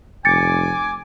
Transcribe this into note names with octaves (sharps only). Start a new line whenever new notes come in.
F1 G#5 D6 A6 C#7